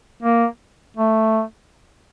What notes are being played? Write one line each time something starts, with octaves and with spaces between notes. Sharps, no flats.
A#3
A3